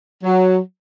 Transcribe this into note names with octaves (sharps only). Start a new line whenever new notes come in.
F#3